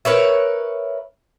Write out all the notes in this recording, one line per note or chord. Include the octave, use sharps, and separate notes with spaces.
A#4 B4 C#5 E5